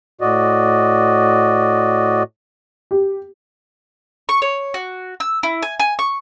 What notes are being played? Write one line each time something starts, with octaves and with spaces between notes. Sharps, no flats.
A2 F#4 D5 D#5
G4
C#6
C#5
F#4
E6
E4
G#5
G#5
C#6